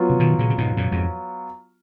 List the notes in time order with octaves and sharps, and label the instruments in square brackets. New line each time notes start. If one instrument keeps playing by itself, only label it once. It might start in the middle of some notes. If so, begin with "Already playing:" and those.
Already playing: [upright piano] F#3 B3 F4
[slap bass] C#3
B2 D#3
A#2 C#3
C#3
G#2 B2
F#2 A#2
F2 G#2